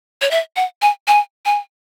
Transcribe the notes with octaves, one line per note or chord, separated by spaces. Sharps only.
C#5
E5
F#5
G#5
G#5
G#5